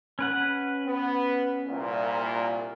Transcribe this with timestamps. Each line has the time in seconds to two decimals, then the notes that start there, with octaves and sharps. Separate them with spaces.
0.19 C#4 B4 F#5
0.86 B3
1.67 C2 A#2